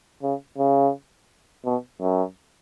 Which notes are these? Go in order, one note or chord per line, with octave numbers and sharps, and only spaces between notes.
C#3
C#3
B2
F#2